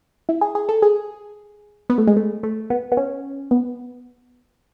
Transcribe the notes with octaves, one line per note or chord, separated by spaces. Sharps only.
E4
G#4
G#4
A4
G#4
B3
A3
G#3
A3
A3
B3
B3
C#4
B3